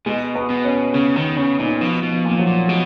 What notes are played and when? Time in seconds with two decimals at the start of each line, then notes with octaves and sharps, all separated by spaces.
0.06 B2 G#3
0.35 B3
0.50 B2
0.64 C#4
0.94 C#3 C#4
1.16 D#3 B3
1.37 C#3 C#4
1.59 A#2 D#4
1.81 B2 F3
2.03 B2
2.11 F3
2.25 A#2
2.31 F3
2.39 F#3
2.47 A#2
2.68 B2 G#3